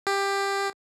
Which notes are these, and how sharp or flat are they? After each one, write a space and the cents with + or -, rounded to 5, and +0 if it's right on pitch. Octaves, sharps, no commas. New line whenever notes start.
G4 +15